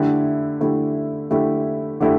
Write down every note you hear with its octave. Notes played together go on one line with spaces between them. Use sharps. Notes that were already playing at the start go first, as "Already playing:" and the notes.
Already playing: D3 A3 E4 G4
D3 A3 E4 G4
D3 A3 E4 G4
D3 A3 E4 G4